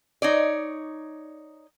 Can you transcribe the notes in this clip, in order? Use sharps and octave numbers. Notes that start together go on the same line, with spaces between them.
D#4 C#5 D5